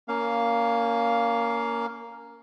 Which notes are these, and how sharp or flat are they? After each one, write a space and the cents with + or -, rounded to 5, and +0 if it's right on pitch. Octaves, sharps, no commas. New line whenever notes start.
A#3 +0 C#4 +30 F5 +0